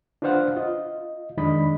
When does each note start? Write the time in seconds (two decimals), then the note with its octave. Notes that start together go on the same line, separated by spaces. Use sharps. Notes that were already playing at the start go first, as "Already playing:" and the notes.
0.22 D4 F4 B4 C5 F5 F#5
0.57 F4 D#5
1.37 F2 D#3 G#3 D4 D#5 B5